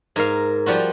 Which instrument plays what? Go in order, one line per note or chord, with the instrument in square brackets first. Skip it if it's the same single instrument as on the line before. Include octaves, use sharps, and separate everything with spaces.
[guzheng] G#2 A#4 F5
F3 G3 F4 F#4